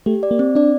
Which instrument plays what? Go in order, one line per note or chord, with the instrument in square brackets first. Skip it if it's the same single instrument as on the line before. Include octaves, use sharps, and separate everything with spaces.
[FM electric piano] A3 [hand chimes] G4
[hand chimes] D5
[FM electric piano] A#3
[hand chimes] C4
[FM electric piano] D4 [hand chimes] D5